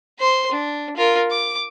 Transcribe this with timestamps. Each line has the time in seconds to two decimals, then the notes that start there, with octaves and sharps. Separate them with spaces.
0.19 C5 C6
0.51 D4
0.97 F4 A#4
1.31 D6